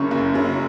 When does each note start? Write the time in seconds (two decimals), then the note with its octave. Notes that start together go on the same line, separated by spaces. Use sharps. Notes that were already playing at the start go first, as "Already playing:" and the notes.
Already playing: F#1 F#2 C#3 C#6
0.11 F#1
0.34 F#2 C#3